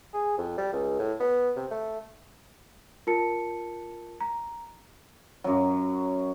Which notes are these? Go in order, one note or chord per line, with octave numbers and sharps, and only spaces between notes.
G#4
F2
G3
C#2
A2
B3
C3
A3
F4 A#4 A5 C#7
A#5
F#2 F#3